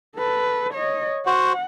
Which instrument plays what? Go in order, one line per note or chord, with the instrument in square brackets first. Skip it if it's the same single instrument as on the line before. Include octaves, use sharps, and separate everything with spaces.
[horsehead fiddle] A4 B4
C#5 D#5
[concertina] F#4 C5 [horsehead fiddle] F#5